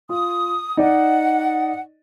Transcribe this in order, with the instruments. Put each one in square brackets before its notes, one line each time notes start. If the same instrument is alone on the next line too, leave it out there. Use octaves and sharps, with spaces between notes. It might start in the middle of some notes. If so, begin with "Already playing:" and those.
[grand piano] F4 [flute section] D#6
[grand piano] D#4 D5 D#5 [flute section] F#5